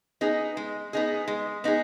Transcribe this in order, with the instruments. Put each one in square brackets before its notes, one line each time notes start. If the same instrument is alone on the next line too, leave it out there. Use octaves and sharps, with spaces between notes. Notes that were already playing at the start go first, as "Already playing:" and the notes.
[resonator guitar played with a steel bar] B3 D#4 G#4
G#3
B3 D#4 G#4
G#3
B3 D#4 G#4